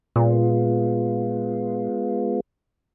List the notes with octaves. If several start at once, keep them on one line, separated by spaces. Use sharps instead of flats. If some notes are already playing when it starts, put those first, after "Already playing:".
A#2 G#3 B3 F4